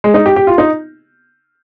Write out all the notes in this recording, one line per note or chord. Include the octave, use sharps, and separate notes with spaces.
G#3
D#4
G4
G4
F4
D#4